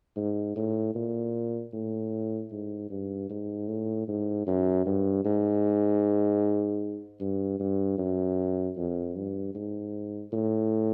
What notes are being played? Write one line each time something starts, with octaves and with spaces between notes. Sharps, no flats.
G#2
A2
A#2
A2
G#2
G2
G#2
A2
G#2
F#2
G2
G#2
G2
G2
F#2
F2
G2
G#2
A2